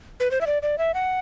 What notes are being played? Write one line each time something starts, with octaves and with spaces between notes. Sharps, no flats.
B4
C5
E5
D5
D5
E5
F#5